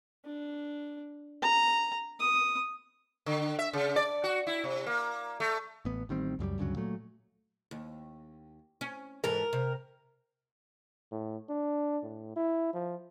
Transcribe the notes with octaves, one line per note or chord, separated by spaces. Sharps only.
D4
A#5
D#6
D3
E5
C#3
D5
F#4
E4
C3
A#3
A3
A1 B3
A1 D#3 G3 C4
C#2 F#2 F#3 G3
D2 G2 C#3 F#3
A#2 F#3 A3
D#2
C#4
G#2 E3 A4 A#4
C3
A2
D4
A2
E4
F3